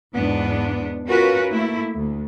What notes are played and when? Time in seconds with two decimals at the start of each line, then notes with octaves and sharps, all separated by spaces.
0.15 E2 G#2 B3 D4
1.06 C#4 F4 F#4 A#4 B4
1.50 A3 A#3 E4
1.93 D2